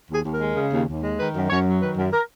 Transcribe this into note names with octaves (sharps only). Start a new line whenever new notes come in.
D#2 G#4
D#2
A#4
G#3
C#3
D#2
D#2
G#3
D#3 B4
F#2
F#2 C#5
F#3
D#3 B4
F#2
A#4